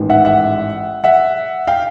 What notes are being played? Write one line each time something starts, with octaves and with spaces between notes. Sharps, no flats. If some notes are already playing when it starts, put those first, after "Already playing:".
Already playing: A1 G#2 D#3
E5 F#5
E5 F#5
E5 F#5
F5 G5